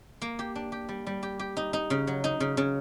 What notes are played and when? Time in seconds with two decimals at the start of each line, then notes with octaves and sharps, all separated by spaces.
0.22 A#3
0.39 G4
0.55 D4
0.72 G4
0.89 G3
1.07 G3
1.23 G4
1.39 G4
1.57 D#4
1.73 D#4
1.90 C#3
2.07 F#3
2.24 D#4
2.40 C#3
2.57 C#3